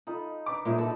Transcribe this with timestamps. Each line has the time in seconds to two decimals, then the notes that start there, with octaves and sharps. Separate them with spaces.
0.07 D#4 F4 A4 B5
0.46 D4 A#4 B4 D6
0.65 A#2 D3 D#4 F4 C#5 E5
0.78 F#4 A4 B5